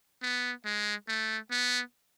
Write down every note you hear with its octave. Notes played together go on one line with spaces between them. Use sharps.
B3
G#3
A3
B3